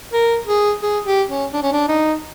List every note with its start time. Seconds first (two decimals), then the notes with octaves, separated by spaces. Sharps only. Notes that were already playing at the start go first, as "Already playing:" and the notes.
0.12 A#4
0.47 G#4
0.82 G#4
1.06 G4
1.29 C#4
1.53 D4
1.63 C#4
1.72 D4
1.88 D#4